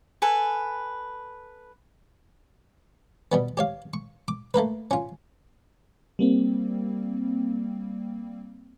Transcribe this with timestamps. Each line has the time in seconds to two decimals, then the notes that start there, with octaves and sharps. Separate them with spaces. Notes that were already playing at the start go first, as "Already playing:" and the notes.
0.22 A4 B4 G#5
3.32 B2 G3 B3
3.57 G4 C#5 F5
3.94 C#6
4.28 D6
4.54 A3 A#3 A#4 B4
4.91 C#4 F4
6.19 G3 A#3 C4